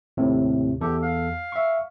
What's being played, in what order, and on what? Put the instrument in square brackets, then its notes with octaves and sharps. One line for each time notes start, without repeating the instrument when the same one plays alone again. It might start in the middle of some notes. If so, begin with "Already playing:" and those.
[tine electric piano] D#2 A2 C3
[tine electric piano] E2 A4 [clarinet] G4
[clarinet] F5
[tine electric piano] E5 C#6